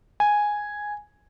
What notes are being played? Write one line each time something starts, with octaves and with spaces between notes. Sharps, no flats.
G#5